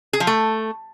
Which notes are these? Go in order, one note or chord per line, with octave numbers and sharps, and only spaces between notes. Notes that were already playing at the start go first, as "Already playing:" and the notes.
G#4
F3
A3